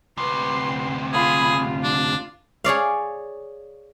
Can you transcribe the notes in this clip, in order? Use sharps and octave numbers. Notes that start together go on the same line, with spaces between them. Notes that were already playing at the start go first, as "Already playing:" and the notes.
D2 C3 B4 C6
F4 G#4 B5
F4
D4
G#4 C#5 D5 F5